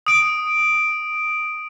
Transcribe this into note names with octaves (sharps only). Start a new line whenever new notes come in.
D#6 D7